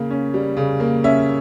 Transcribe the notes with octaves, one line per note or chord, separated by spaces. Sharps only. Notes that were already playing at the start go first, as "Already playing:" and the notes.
Already playing: C#3 A#3
C#4
G3
C#3
A#3
C#4 E5